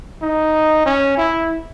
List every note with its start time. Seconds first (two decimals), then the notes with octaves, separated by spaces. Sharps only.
0.22 D#4
0.86 C#4
1.18 E4